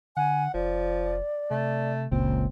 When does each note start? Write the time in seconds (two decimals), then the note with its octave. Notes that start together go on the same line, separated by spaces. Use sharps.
0.17 D3 F#5 G#5
0.54 F1 F3 D5
1.51 C3 A3
2.12 F#1 C#2 A#2 C4